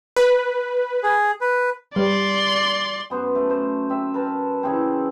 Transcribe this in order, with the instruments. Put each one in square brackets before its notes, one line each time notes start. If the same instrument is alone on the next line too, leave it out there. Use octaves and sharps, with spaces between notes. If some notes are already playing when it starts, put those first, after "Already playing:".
[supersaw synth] B4
[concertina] G#4
B4
[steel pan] G3 [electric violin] D5 C6
[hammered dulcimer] F#2 B3 C5
A3
C5
C4 E5
A#4 B4 A5
C#3 E3 C4